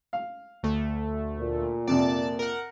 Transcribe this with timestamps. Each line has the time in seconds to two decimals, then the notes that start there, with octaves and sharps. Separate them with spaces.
0.13 F5
0.63 D2 A3
1.39 A#2
1.88 F2 C3 D5 A5
2.39 A#4 F#5